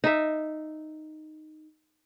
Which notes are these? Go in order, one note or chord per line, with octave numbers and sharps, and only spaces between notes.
D#4 E5